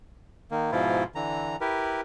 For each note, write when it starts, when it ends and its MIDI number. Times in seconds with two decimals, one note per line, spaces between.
0.51 0.71 51
0.51 0.71 58
0.72 1.04 44
0.72 1.04 47
0.72 1.04 53
0.72 1.04 64
0.72 1.04 65
1.15 1.56 50
1.15 1.56 52
1.15 1.56 82
1.61 2.01 64
1.61 2.01 67
1.61 2.01 70
1.61 2.01 71